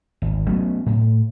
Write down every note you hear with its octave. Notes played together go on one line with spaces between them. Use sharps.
G#1
F#3 A3 B3 C#4
A2